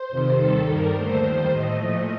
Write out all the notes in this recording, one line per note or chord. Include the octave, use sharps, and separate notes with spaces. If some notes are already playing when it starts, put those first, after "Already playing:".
Already playing: C5
F2 C3 D#3
D#2 D#3 G3 A4
G2 D#3 G3 A#4
D#2 D3 A3 C5
F2 D#3 G3
A2 A3 D#5
A#2 F3 A3